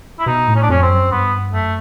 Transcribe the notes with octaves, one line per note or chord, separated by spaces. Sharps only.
E4
B2 D#4
A2
C#4
D4
F2 C#4
C4
F#2
G2 B3
F#2 A3